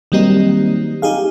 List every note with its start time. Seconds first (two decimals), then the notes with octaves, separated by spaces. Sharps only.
0.12 D#3 F#3 G3 A#3 C4 D#4
1.02 D#4 G4 G#4 F5